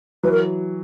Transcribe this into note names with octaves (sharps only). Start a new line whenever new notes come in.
E3 F#3 B4
A#4